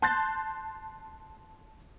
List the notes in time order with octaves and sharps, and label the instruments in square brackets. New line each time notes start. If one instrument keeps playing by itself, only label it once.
[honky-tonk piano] A5 C6 F#6 G6 A6